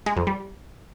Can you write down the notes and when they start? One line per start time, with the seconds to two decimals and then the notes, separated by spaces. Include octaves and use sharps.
0.06 G#3
0.17 F2
0.27 G3